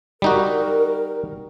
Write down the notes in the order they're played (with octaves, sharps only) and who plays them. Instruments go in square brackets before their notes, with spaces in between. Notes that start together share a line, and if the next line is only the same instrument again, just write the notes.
[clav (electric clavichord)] G3 D#4 F#4 [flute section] A#4